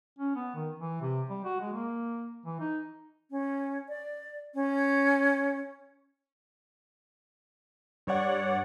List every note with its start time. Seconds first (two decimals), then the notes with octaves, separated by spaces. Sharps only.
0.19 C#4
0.36 B3
0.55 D#3
0.79 E3
1.02 C3
1.30 G3
1.45 F#4
1.60 G#3
1.73 A#3
2.46 E3
2.60 D#4
3.30 C#4
3.88 D5
4.54 C#4
8.07 G2 C#5 D5 F#5